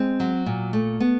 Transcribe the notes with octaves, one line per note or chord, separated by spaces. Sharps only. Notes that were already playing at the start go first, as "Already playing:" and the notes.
Already playing: G#3 C4
F#3
A#2
A3
B3